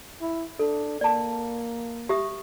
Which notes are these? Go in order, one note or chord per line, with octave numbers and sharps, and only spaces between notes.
E4
D4 A4
A#3 D5 A5
G4 E5 D#6